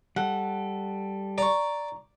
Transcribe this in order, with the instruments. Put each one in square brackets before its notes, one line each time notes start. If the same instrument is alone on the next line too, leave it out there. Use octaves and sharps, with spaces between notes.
[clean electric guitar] G3 A4 [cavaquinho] F#5
[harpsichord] D5 [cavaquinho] A#5 C#6